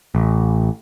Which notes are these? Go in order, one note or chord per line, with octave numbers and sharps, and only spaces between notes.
A1